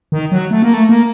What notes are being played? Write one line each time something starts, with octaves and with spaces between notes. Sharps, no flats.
D#3
F#3
A3
A#3
A3
A#3